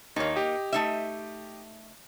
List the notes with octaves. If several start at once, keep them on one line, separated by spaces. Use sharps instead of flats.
D#2 A#3 D#4 C#5
G4 D#5
A3 D#4 E5